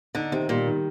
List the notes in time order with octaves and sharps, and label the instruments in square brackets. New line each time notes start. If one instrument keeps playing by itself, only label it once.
[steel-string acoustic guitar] D3 [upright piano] D#4
[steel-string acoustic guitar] C3 [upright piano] D#3
[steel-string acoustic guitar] A#2 [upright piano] G3
[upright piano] D#3